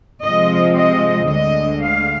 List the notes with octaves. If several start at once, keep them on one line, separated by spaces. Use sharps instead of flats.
C3 F3 G#3 C4 D#5
D#5
D2 D3 G#3 D#5
F5